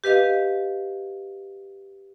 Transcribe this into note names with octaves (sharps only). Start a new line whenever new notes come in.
G4 B4 D#5 F5